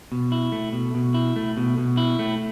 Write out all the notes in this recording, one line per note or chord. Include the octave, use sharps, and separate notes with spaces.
B2
E4
A3
B2
B2
E4
A3
B2
B2
E4
A3